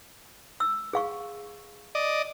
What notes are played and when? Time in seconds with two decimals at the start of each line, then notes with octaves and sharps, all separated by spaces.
0.60 E6
0.93 G#4 F5 C#6
1.95 D5 D#5